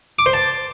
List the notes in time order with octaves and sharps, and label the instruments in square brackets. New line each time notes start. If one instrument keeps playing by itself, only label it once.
[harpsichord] D6
C5
A5